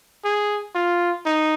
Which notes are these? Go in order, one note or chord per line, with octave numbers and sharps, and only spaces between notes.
G#4
F4
D#4